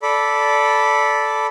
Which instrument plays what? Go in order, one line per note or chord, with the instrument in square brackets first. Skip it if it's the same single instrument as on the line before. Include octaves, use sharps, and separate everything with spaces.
[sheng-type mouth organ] A4 D5 B5